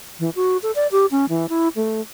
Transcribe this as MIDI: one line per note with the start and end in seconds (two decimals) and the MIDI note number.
0.19 0.30 52
0.36 0.57 66
0.63 0.71 69
0.75 0.87 74
0.92 1.06 67
1.11 1.26 61
1.29 1.49 52
1.49 1.68 64
1.76 2.01 57